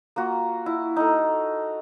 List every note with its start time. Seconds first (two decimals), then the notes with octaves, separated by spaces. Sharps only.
0.16 A#3 F4 F#4
0.66 E4
0.96 D#4 A4